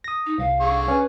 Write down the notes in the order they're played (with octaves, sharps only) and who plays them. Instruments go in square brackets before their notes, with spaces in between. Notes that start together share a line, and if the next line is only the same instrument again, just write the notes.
[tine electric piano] D#6 A#6
[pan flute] D#4
[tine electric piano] C2 [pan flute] F5
[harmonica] D3 G#4 C#6
[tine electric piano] C#4 [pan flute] B4